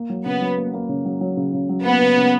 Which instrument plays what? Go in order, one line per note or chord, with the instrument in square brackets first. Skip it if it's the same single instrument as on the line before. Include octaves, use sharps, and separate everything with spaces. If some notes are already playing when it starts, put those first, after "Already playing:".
Already playing: [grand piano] A#3
F#3
[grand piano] C#3 [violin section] B3
[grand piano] F#3
A#3
A#3
C#3
F#3
F#3
C#3
C#3
F#3
[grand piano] A#3 [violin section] B3
[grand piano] C#3
C#3